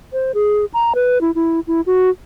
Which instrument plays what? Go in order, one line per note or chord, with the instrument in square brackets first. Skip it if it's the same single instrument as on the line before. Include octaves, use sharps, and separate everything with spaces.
[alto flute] C5
G#4
A#5
B4
E4
E4
E4
F#4